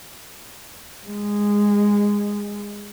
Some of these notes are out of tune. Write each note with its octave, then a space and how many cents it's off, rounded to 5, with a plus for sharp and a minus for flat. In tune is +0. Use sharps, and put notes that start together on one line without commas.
G#3 -15